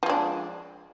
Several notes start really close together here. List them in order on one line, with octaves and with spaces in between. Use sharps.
F3 G#3 D4